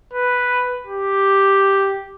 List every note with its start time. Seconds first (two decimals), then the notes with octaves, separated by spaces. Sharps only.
0.13 B4
0.87 G4